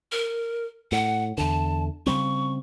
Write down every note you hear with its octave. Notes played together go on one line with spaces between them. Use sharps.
A#4
A2 F#5
E2 D3 A5
C#3 G3 C4 C#6